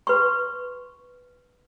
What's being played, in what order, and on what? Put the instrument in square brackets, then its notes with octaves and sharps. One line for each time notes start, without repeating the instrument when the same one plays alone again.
[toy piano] B4 C6 C#6